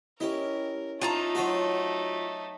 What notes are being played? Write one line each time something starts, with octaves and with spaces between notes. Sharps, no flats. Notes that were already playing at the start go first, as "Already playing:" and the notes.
C#4 E4 G4 A#4 D#5
A3 D#4 F4 C#5 A5 A#5
F#3 F#4 C5 C#5 D#5